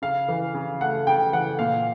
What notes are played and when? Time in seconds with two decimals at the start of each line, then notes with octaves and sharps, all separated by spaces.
0.02 C#3 F5
0.28 E3
0.54 C#3
0.81 A3 F#5
1.07 C#3 G5
1.33 E3 F#5
1.59 A#2 F5